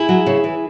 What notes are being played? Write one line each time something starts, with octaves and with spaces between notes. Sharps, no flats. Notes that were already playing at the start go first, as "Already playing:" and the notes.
Already playing: E4 G#4
F#3
C#3
E3